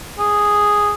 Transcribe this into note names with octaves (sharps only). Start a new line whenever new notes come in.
G#4